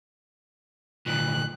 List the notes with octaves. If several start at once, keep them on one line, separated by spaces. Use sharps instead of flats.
D2 A#2 F#6